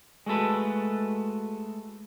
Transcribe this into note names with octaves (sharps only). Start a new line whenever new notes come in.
G#3 A3 F#4 A4 B4